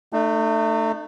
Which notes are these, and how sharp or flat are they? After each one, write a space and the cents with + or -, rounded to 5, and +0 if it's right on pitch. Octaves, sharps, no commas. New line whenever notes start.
A3 +10 D#4 -40